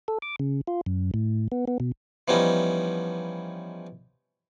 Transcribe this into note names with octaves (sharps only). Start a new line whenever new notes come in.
A4
D6
C#3
F4
F#2
A2
B3
B3
B2
E3 F3 G3 B3 C#4 D#4